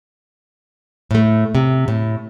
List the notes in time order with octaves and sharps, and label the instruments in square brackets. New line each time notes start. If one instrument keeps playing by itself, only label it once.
[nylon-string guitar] A2 A3
C3
A2